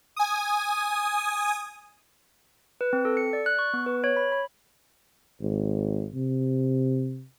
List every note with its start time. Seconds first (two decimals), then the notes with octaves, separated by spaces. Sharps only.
0.16 G#5 D#6
2.81 B4
2.93 C4
3.05 A4
3.17 C#7
3.33 D5
3.46 F#6
3.59 C#6
3.74 B3
3.86 B4
4.04 C#5
4.17 B5
4.32 B5
5.40 G#1
6.15 C3